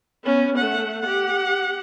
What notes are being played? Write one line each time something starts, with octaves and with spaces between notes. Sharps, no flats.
B3 C#4
A3 F#5
G4 F#5